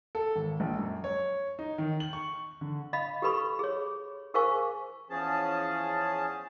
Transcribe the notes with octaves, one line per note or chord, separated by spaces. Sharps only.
A4
G#1
A#1
F#2
C#5
D#4
D#3
F#7
C#6
D3
D#5 F5 B5
G4 A4 B4 B5 C#6
G#4 C#5
G#4 A#4 C5 F5 G#5 C#6
E2 F3 C#4 G#4 A5